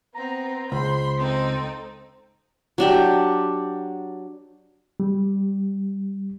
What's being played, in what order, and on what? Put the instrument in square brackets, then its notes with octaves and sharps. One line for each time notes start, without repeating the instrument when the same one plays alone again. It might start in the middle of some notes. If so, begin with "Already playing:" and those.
[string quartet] B3 C4 [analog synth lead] A#5
[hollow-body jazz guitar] C#2 [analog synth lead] C5 [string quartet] B5 C6
[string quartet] C4 D#4 A4
[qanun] F#3 D4 G4
[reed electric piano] G3